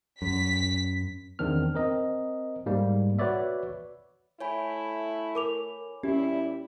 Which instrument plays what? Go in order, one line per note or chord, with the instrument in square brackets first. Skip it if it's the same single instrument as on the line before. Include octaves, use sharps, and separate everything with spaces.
[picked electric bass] F#2 [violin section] B6
[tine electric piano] E2 D#3 C4 D4 F6
C4 A#4 D#5
G#2 G3 A#3
F#4 B4 C#5 D5 E5
[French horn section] A3 E4 [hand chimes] C#5 G#5 B5
[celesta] A#4 D6 F7
[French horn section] A#2 G3 E4 [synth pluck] C#4 [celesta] G4